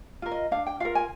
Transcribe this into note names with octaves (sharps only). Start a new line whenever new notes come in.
F4 A#4
D#5
D4 F5
G5
F4 A#4 F5
G#5